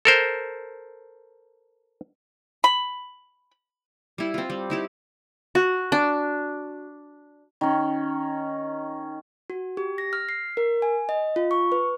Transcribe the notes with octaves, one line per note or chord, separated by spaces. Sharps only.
A4 A#4 C5
B5
G3 E4
C4 F4
G3
D#4 E4 G4
F#4
D4
D#3 C#4
F#4
G4
A#6
F6
C7
A#4
G#5
D#5
F4
C#6
B4